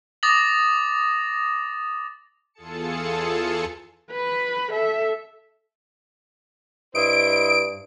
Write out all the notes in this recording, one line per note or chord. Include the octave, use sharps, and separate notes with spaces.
D6 D#6 A6 A#6 F#7
E2 F4 G#4 A4 A5 C#7
B4 B5
A4 E5
G2 E4 C5 D#5 D7